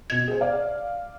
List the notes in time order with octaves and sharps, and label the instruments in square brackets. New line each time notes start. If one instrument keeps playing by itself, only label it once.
[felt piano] B2 D#5 [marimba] G#6
[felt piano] G#4 C5
D5 F5